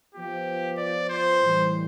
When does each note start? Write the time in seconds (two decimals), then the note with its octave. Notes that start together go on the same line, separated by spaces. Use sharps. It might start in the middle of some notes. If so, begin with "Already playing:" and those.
0.14 F3 B3 F4 G4
0.77 D5
1.09 C5
1.41 A2 E3 G3